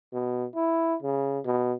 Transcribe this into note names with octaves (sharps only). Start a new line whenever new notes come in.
B2
E4
C#3
B2